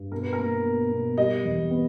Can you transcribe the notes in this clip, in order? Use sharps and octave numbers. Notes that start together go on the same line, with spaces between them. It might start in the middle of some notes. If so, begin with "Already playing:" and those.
Already playing: G2
B2 A#4
B4
A#4
A#3
B2
B2
G3 D#5
E2
B3